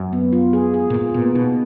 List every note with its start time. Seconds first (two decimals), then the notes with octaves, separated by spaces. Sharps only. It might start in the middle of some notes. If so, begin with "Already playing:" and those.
Already playing: F#2
0.13 B3
0.33 F4
0.53 G#4
0.74 G#4
0.90 A#2
0.94 G#2 F4
1.14 A#2 B3
1.35 B2 D#4